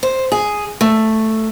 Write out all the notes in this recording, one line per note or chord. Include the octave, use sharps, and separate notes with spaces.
C5
G#4
A3